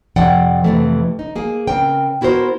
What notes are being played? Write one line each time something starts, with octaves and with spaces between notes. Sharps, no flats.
F2 C3 F3 D5 F#5 G5
F2 G#2 C3 E3 A3
D#4
A#3 G#4
C#3 C4 A#4 G5
B3 E4 F#4 A#4 C5